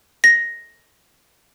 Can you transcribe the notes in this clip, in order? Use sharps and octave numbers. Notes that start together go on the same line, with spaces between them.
A#6